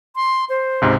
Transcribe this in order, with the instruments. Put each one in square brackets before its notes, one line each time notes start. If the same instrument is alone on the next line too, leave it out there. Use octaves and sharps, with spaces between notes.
[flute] C6
C5
[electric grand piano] C#2 G#2 C3